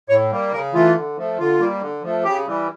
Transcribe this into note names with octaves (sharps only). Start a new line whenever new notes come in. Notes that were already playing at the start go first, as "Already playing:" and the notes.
A2 C#5
G3 A#3
C#3 A#4
E3 A3 F4
D3
F3 A3
D3 F4
G3 A#3
D3
F3 A3
C#3 G4
E3 G3